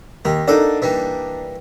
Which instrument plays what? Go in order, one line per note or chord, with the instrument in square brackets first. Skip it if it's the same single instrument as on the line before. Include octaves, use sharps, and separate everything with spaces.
[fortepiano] D#2 [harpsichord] G4 A#4
[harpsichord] A#3 A4 F#5 [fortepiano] D4 D#4
[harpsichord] E3 G3 A#3